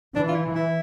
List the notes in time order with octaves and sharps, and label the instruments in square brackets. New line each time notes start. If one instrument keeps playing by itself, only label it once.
[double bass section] E3 [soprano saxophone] D4
[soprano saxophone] F4
E4
E4